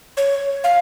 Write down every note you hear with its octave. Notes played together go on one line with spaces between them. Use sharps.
C#5
F5